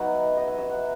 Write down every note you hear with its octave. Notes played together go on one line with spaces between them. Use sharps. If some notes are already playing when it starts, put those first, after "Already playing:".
Already playing: F#3 B3 D#4 E5 F#5
D#5
E5
E5
F#5